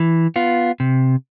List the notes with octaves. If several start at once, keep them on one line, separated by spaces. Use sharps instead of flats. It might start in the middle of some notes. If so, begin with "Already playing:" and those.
Already playing: E3
B3 F4
C3